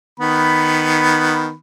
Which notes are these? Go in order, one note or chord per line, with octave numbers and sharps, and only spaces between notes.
D#3 B3 B5